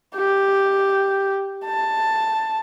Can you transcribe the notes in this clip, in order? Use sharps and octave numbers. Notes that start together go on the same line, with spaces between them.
G4
A5